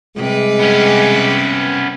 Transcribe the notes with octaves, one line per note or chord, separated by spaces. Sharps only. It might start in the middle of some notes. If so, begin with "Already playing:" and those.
C3 G3 G#3 B4
B3 C#4